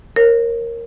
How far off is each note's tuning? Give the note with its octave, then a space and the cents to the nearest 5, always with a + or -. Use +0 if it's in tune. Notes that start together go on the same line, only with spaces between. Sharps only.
A#4 +0 C#5 -35